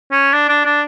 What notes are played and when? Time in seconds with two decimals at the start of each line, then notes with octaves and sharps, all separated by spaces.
0.11 C#4
0.33 D4
0.48 D4
0.65 D4